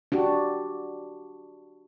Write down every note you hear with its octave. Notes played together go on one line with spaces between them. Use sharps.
D4 F#4 G4